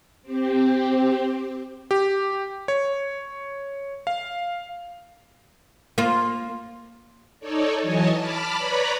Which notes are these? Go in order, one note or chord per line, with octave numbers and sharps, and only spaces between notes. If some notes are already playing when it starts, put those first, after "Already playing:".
C4 G4
G4
C#5
F5
A#3 F4
D#4 A4 C#5 D5
E3 F#3 C#5 D#5 G#5 A5
A5 B5 D6 F6
B4 C#5 D5 A#5 B5